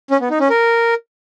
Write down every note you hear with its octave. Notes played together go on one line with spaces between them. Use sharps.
C#4
B3
D#4
C#4
A#4